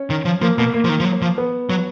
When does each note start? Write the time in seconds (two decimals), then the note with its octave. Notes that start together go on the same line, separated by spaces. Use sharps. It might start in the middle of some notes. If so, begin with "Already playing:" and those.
Already playing: C#4
0.10 D#3
0.25 F3
0.42 F3 A#3
0.58 B2 A#3
0.73 A#3
0.85 F3
0.89 D#3
1.00 F3
1.05 F#3
1.22 F3
1.38 B3
1.70 F#3